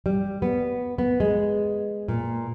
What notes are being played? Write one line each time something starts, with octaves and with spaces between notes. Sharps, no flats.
G3
B3
B3
G#3
A#2